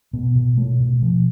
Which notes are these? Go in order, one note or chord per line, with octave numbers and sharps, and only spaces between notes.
B2 B3
B2
B2 A3
B2
B2 F3